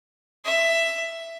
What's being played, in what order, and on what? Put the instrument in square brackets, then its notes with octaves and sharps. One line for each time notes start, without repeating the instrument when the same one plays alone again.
[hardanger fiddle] E5